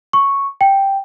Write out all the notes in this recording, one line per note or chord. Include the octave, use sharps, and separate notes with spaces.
C#6
G5